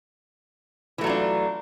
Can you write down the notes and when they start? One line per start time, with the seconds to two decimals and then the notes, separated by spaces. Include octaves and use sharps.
0.98 E3
1.01 A3
1.04 F#3
1.07 F4
1.09 D4